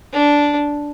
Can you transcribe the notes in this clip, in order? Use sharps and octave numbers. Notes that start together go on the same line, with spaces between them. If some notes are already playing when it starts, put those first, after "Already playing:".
D4